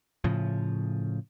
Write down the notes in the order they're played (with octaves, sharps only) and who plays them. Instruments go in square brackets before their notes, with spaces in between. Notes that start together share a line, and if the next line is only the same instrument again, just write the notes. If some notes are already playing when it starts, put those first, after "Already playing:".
[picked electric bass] A2 C#3 F3